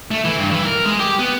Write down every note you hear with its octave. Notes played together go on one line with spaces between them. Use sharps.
A3
E3
G2
E3
A#4
G#3
G4
B3